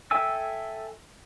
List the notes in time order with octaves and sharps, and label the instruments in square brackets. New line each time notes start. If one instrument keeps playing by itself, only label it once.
[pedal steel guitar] A4 E5 G5 G#5 E6